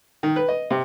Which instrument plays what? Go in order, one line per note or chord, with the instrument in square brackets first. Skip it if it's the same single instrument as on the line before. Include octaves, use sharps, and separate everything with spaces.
[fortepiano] D#3
B4
D#5
C3